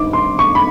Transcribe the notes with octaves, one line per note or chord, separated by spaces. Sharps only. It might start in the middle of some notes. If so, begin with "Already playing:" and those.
Already playing: G#1 G2 D#3 D6
C6
C#6
B5